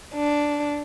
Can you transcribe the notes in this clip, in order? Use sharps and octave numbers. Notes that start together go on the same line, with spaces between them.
D4